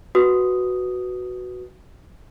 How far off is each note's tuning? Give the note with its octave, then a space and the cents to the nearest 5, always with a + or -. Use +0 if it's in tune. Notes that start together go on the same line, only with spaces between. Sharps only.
F#4 +0 B4 +0 D#6 +0